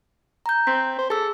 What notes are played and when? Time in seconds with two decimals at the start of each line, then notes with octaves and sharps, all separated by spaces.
0.46 A#5 G6
0.67 C4 B6
0.99 C5
1.10 G#4 A4 E6